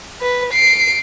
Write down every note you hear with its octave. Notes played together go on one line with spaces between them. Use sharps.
B4
C7 D7